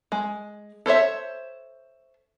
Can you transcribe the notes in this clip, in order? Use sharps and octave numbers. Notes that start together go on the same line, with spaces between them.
G#3
A4 C5 C#5 E5